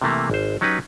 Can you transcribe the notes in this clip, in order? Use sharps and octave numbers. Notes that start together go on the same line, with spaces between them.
C3 E3 A3 A#3
G#1 C5
F#3 C#4 D#4 G4 B4